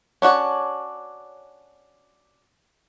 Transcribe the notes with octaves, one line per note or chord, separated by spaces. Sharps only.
C#4 D4 F#4 C#5